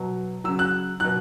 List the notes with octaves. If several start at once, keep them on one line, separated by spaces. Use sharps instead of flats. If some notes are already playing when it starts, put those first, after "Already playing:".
Already playing: B2 F#3
C#3 F#3 E6
F#6
B2 F#3 F#6